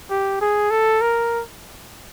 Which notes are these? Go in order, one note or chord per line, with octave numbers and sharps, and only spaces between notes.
G4
G#4
A4
A#4